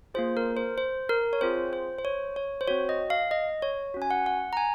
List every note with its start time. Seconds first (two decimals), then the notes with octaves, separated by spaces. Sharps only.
0.14 A#3 F4 G#4 C5
0.37 A#4
0.57 C5
0.78 C5
1.09 A#4
1.33 C#5
1.41 C4 F4 G#4 C5
1.73 C5
1.99 C5
2.05 C#5
2.36 C#5
2.61 C5
2.68 C4 F#4 C#5
2.89 D#5
3.10 F5
3.31 D#5
3.62 C#5
3.94 C#4 F#4
4.02 G#5
4.11 F#5
4.26 F#5
4.53 A#5
4.57 G#5